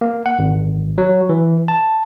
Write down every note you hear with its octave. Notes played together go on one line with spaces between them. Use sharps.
A#3
F#5
G#1
F#3
E3
A5